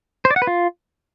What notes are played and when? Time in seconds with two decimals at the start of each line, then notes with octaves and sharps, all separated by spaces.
0.25 C5
0.31 D5
0.36 F#5
0.42 B4
0.47 F4